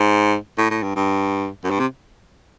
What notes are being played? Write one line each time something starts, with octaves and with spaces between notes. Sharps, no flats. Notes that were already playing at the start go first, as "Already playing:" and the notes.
Already playing: G#2
A2
A2
G2
G2
F#2
G2
C3